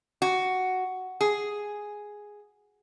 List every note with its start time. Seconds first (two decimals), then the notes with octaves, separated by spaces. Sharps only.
0.22 F#4
1.21 G#4